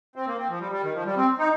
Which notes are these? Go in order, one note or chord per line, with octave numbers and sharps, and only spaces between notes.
C4
A#3
C4
F3
G3
G3
D#3
F3
G3
C4
D#4